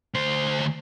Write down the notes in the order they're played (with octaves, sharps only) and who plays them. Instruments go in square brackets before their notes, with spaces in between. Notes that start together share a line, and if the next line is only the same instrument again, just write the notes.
[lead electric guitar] D2 C5